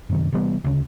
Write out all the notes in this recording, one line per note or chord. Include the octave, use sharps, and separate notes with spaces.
F#2 C3 D#3
C3 E3 G3 B3
D2 C#3